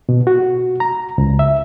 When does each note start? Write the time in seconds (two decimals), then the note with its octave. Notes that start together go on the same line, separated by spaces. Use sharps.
0.09 B2
0.27 F#4
0.80 A#5
1.18 C#2
1.39 E5